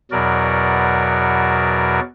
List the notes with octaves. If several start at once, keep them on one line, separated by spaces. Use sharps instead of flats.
E2 B2 F#3 F#4 A#4 D5